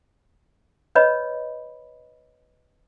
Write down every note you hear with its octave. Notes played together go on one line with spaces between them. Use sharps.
B4 C#5 D#5 B5